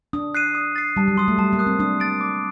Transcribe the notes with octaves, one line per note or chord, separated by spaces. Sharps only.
D4 D#6
F#6 C7 D#7
D#6
A6 C7
G3 A5
F#3
G3 C6 D#6
A3
G3 A5
A#3
D#6 F#6
C4
D4 D#6
A6 D7
D6